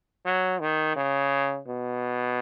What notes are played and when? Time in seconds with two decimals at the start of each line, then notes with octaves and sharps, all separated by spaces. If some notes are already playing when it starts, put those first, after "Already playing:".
0.25 F#3
0.60 D#3
0.96 C#3
1.68 B2